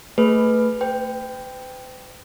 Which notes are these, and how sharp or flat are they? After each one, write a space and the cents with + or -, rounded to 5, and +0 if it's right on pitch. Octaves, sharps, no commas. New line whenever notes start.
A3 +30 G#4 +25 B4 +0
B4 +45 G5 +5